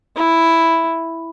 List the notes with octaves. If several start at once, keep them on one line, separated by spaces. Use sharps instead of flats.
E4